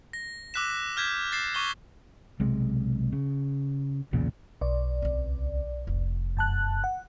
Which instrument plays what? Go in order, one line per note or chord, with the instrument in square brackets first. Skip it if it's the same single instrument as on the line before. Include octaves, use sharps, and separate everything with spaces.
[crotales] A#6
D6 E6 F#6 B6 E7
F6 G6 G#6 B6 E7
A6 C7 E7
C#6 D6 G7
[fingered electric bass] B1 C3 G#3
C#3
B1 E2 A#2 C#3
[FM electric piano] B1 D5
[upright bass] C#2 C4
F1
[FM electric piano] F#2 A5 F#6
F#5